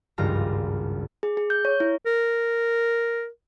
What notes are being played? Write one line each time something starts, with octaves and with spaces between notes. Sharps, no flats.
G#1 C#2 G2 G3 F4 A#5
G#4
G#4
G6
C#5
E4
A#4